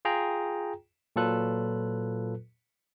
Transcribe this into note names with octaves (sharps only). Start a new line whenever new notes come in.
F4 G#4 G5 A#5
A#2 F#3 F4 A4 B4 F#6